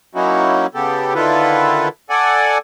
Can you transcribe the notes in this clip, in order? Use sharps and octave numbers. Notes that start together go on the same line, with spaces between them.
F#3 A#3 C#4 D#4 E4 F#4
C#3 B3 G4 A4
D3 D#3 E4 F4 A4 B4
A4 D5 F#5 G#5